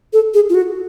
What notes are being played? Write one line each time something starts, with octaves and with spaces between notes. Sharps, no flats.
A4
G#4
F4
F#4